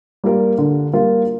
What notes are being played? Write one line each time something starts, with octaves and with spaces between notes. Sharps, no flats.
G3 A#3 F4 A#4
D3
G3 A#3 F4 A#4